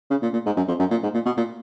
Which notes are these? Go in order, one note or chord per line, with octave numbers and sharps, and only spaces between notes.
C#3
A#2
A#2
G#2
F#2
F2
F#2
A#2
G#2
A#2
B2
A#2